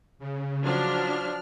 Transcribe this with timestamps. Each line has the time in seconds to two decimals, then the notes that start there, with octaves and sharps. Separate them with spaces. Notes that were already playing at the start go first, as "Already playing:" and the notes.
0.19 C#3
0.63 F3 F#3 D4 F6